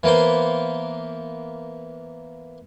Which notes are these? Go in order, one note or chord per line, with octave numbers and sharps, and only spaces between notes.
E3 A#3 B3 C5